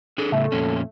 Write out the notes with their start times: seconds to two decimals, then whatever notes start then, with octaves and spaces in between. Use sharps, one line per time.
0.18 D4 G#4 A4
0.32 A2 C#3 A3
0.52 F2 A#2 C#4